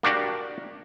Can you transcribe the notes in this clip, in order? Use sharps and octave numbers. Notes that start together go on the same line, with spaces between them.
A#3 D4 F#4 G4 D5